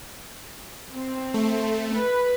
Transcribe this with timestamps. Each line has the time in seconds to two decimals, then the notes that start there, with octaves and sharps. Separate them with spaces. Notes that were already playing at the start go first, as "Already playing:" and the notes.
0.95 C4
1.34 A3
1.96 B4